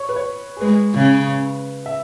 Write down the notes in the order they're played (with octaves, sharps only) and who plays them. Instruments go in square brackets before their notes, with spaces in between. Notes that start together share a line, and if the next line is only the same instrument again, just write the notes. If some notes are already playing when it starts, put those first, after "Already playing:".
Already playing: [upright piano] C#5
B4
C#5
G#4
[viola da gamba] G#3 [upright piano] B4
[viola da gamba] C#3
[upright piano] E5